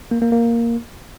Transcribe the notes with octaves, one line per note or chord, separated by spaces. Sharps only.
A#3
A#3
A#3